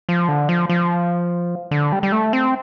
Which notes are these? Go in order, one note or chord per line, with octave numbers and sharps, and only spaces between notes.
F3
D3
F3
F3
D3
G3
G3
A3
C4